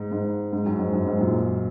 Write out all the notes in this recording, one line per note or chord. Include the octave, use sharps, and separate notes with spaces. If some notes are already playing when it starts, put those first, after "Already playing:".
Already playing: G#2
G#2
G#2
F#2
G#2
F#2
G#2
F#2 A#2